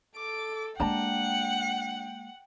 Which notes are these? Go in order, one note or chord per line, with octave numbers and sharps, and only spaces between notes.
A4 D6
G#3 A#3 D4 F#5 G5 A5 A#5